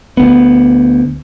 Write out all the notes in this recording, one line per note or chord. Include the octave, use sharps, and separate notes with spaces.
D2 B3